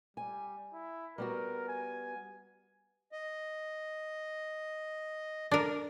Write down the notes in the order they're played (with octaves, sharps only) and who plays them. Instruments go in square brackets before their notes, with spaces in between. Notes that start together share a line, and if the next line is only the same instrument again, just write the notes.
[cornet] G3 [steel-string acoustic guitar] G#5
[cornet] E4
[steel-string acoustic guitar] G3 B3 F#4 [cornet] A#4
[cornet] G#5
[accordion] D#5
[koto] D4 A#4